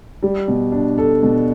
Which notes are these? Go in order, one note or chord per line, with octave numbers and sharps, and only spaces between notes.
G3
B2
D4
A4
B2